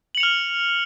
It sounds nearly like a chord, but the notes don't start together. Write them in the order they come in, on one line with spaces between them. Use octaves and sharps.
F#7 C#7 F7 F6